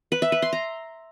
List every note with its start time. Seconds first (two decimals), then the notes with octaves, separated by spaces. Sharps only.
0.12 B4
0.22 E5
0.32 B4
0.42 C6
0.53 A#5